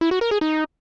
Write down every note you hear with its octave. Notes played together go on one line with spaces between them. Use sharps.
E4
F#4
A#4
G#4
D#4